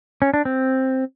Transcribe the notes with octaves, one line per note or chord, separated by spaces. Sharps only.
C#4
D4
C4